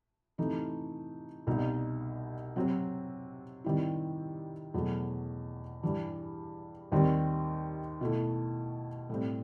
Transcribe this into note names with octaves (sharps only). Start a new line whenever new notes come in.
C3 E3 A3 D#4
C2 B2 G3 D#4
C3 F#3 C4
C3 D#3 G3 C4 E4
E2 B2 F#3 A3
G2 E3 G3
D#2 D#3 G3 C4
B2 A3 E4
A2 G3 C4